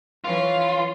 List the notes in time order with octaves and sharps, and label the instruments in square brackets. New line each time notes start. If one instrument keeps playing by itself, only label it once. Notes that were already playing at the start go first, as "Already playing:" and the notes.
[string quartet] E3 C#4 [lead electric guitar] F4